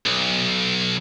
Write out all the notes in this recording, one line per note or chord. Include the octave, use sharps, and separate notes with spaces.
B1